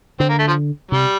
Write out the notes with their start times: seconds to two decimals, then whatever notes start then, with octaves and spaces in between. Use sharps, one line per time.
0.20 D3 C4
0.29 A#3
0.39 A3
0.48 F3
0.91 C3 G3